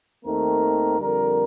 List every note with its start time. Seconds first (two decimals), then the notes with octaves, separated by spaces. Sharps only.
0.25 D#2 D#3 A3 C4 A#4
0.99 F2 D3 G3 A#4